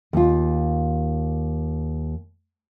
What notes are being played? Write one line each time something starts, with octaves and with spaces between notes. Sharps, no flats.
D#2 F4